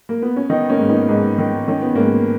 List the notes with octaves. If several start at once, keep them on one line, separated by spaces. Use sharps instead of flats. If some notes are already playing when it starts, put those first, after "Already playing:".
A#3
B3
C#4
D#3 B3 D#4
A#3 C#4
G#2
B3 D#4
G#2 B3 D#4
D#3
D#3 C#4
B3
G#2 A#3 C#4